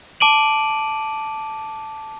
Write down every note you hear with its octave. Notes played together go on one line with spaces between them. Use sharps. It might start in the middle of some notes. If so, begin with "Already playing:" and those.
A5 D6 D7 D#7 F#7